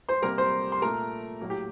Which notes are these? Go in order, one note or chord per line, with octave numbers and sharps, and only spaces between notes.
C5 C6
C3 G3 A#3 A#4 A#5
C5 C6
C6
A#2 A3 A#4 A#5
A2 F#3 A#3
G4 G5